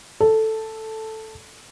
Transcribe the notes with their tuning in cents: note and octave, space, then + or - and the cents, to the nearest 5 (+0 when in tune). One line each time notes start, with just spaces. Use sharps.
A4 +0